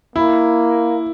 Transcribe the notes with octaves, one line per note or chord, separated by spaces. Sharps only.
A#3 E4